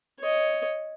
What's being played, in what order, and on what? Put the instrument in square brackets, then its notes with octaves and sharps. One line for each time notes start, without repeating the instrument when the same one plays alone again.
[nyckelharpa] C#5 D#5